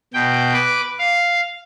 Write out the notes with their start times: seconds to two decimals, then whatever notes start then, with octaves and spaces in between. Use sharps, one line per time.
0.13 B2 G5
0.54 B4 D6
0.99 F5